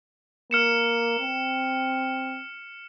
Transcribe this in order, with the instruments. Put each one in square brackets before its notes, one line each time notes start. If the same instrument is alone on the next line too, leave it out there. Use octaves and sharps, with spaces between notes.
[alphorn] A#3 [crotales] F6 C#7 E7
[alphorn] C4